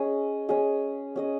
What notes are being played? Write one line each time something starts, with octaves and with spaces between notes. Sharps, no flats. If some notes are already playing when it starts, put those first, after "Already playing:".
Already playing: C#4 G#4 D#5
C#4 G#4 D#5
C#4 G#4 D#5